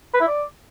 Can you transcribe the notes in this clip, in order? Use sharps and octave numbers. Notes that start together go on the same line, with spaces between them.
B4
E4
D5